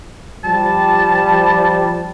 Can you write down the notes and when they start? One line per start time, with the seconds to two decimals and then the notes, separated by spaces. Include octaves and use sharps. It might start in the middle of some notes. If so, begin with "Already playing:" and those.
0.44 F3 G3 A5